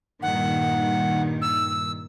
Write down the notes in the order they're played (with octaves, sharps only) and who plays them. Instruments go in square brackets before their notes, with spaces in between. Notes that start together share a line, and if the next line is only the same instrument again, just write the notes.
[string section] G2 A#2 D#3 [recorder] F#5
[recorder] E6